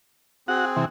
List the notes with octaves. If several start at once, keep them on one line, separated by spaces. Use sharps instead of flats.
C4 F#4 G#4 F#5
C3 E3